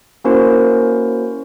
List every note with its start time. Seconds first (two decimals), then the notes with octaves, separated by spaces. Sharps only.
0.24 A#3 C#4 E4 F#4 A#4 C5